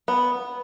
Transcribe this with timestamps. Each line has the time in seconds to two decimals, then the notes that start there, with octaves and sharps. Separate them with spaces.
0.08 B3